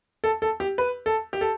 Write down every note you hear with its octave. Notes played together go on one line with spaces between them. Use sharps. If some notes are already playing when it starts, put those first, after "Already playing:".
A4
A4
G4
B4
A4
G4
A4